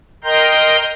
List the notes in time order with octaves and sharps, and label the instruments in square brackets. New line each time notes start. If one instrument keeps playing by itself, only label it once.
[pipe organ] A#4 D#5 G5 A#5 C6 G6